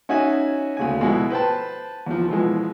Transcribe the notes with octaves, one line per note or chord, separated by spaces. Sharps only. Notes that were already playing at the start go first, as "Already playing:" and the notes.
C#4 D#4 F#4 E5 G#5
D2 C#3 G#5
B2 F3 G#3 E4
B4 C5 G5 A5
E2 F3
B2 E3 F3 G#3